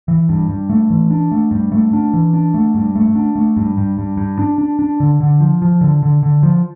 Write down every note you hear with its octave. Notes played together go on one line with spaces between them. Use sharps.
E3
G2
G2
A3
E3
D4
A3
G2
A3
D4
E3
D4
A3
G2
A3
D4
A3
G2
G2
G2
G2
D4
D4
D4
D3
D3
F3
F3
D3
D3
D3
F3